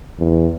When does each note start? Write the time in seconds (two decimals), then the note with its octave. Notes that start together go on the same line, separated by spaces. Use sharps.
0.19 E2